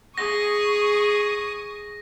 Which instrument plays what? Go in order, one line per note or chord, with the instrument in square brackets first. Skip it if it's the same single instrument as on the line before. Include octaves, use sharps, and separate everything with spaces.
[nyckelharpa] G#4 [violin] C#6 D#6 [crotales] A#6